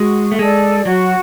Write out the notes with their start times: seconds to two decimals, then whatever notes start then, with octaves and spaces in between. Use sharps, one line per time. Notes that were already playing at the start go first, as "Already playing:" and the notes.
Already playing: G#3 F#4
0.32 A3
0.39 G#3 A4 D5
0.85 F#3 F#4